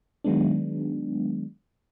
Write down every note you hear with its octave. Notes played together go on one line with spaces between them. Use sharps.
D#3 F#3 G#3 B3 D4